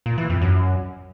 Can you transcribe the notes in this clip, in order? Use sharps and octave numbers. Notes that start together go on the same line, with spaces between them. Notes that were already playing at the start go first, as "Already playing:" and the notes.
A#2
E3
F2
F#2